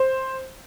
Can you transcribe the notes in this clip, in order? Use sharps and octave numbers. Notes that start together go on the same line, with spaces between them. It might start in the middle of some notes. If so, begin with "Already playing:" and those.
Already playing: C5